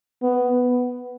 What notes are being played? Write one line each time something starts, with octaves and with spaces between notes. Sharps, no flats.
B3